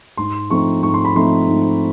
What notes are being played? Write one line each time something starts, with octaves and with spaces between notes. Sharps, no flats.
G#2 C6
F3 A3 C4 D#4 C#6
G#2 C#6
C6
B5
F3 A3 C4 D#4 C6
G#2